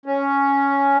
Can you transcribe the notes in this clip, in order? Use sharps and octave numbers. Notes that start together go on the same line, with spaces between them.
C#4